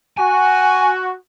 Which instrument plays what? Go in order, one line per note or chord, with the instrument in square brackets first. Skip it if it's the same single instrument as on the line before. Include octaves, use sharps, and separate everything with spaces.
[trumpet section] F#4 [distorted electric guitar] G#5